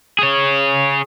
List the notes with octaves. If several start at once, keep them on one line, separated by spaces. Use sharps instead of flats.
G#4 C#5